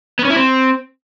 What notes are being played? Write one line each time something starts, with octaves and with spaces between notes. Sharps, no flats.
B3
C#4
E4
C4